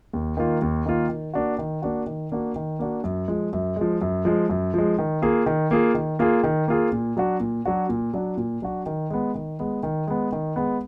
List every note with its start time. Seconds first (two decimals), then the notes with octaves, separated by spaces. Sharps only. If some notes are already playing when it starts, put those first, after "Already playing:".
0.13 D#2
0.37 D#3 A#3 F4
0.62 D#2
0.86 D#3 A#3 F4
1.09 D#3
1.34 A#3 D4 F#4
1.58 D#3
1.82 A#3 D4 F#4
2.06 D#3
2.32 A#3 D4 F#4
2.56 D#3
2.79 A#3 D4 F#4
3.04 F#2
3.28 F3 G#3
3.53 F#2
3.76 F3 G#3
4.02 F#2
4.25 F3 G#3
4.50 F#2
4.74 F3 G#3
4.99 D#3
5.22 A#3 F4 G#4
5.46 D#3
5.71 A#3 F4 G#4
5.94 D#3
6.19 A#3 F4 G#4
6.44 D#3
6.68 A#3 F4 G#4
6.92 A#2
7.17 F#3 D4 F#4
7.40 A#2
7.65 F#3 D4 F#4
7.89 A#2
8.14 F#3 D4 F#4
8.37 A#2
8.62 F#3 D4 F#4
8.86 D#3
9.10 G#3 B3
9.35 D#3
9.59 G#3 B3
9.83 D#3
10.07 G#3 B3
10.32 D#3
10.56 G#3 B3